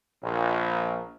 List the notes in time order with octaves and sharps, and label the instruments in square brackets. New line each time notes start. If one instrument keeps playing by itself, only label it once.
[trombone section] A#1